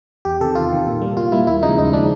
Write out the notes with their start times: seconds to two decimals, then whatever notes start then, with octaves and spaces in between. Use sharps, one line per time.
0.25 E2 G4
0.41 C3 D#3 A4
0.55 E2 F4
0.71 C3 D#3
0.87 A#2
1.01 G3 A#3
1.17 A#2 F4
1.32 G3 A#3 E4
1.47 D#2 E4
1.62 C#3 F3 G#3 D#4
1.78 D#2 D#4
1.93 C#3 F3 G#3 D4